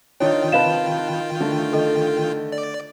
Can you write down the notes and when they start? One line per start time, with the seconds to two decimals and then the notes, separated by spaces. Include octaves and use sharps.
0.20 D#3 D4 D#4 F4 C#5 G5
0.52 C3 B4 D#5 F5 A5 E7
1.40 D3 A3
1.73 A4 D#5
2.52 D5